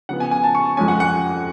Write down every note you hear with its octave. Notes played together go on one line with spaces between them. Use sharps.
C#3 F3 B3 F#5
G#5
G#5
A5
C#6
F2 F3 G#3 C#4 G#5
F#5
F#5